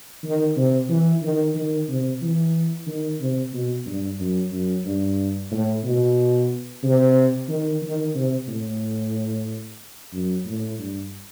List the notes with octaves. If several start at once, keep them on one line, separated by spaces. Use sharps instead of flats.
D#3
C3
E3
D#3
D#3
C3
E3
D#3
C3
B2
G2
F#2
F#2
G2
A2
B2
C3
D#3
D#3
C3
A2
F#2
A2
G2